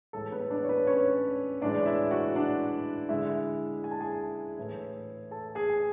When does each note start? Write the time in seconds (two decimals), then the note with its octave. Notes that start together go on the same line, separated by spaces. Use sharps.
0.13 A2 E3 G#3 A4
0.32 B3 B4
0.51 D4 D5
0.64 C#5
0.69 B3 B4
0.87 C#4 C#5
1.61 A2 E3 G#3 D4 D5
1.78 D5
1.86 E4 E5
2.11 F#4 F#5
2.35 D4 D5
3.09 D3 G#3 E4 E5
3.84 G#5
3.91 A5
4.00 G#4 G#5
4.58 A2 E3 A3
5.31 A4 A5
5.55 G#4 G#5
5.70 G#5